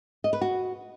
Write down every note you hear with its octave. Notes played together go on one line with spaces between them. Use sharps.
D#5
B4
F#4